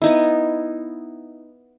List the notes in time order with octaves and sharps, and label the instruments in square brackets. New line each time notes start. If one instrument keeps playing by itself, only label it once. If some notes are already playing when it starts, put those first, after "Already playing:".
[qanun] B3 D#4 E4